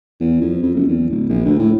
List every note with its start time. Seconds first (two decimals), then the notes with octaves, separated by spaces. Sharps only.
0.20 E2
0.41 F2
0.63 F2
0.75 F#1
0.88 E2
1.10 D1
1.29 A#1
1.45 D2
1.59 A2